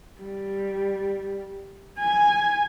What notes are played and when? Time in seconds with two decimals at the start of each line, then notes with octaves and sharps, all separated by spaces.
0.21 G3
1.99 G#5